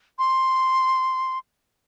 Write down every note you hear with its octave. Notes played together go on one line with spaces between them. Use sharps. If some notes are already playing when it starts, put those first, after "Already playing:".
C6